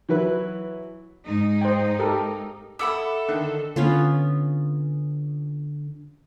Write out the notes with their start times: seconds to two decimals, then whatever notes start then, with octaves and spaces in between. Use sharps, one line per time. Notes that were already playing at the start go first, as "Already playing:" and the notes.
0.09 E3 F#3 E4 B4
1.25 G#2 D#4
1.61 C5 G5
1.99 G4 A4 A#4
2.79 A4 E5 F#5 B5 D6 E6
3.28 D3 D#3
3.76 D3 B3 C#4 F4